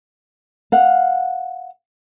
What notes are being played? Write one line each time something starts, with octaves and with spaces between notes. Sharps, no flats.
F5 F#5